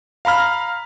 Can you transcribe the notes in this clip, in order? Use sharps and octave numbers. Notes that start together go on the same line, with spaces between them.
F5 A#5 B5 F6